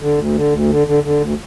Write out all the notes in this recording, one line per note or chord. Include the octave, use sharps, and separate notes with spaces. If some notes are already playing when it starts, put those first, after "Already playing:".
D3
D2
D3
D2
D3
D3
D3
D2